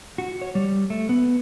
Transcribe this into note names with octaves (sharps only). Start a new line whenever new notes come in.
F#4
C#5
G3
A3
B3